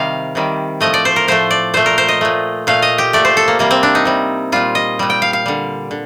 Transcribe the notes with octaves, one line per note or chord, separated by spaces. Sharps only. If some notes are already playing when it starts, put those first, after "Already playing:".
Already playing: C3 D#3 G3 F5
C3 D#3 G3
A2 F3 A3 D#5
D5
C5
A#4
A2 F3 A3 C5
D5
A#2 A3 C5
A#4
C5
D#5
A#2 A3
A#2 A3 F5
D#5
G4
A#2 A3 D5
C5
A4
A#3
C3 G3 A#3
C4
D4
D#4
C3 G3
A#2 G3 F4
D#5
A#2 G3
G5
F5
F5
D3 G3
D3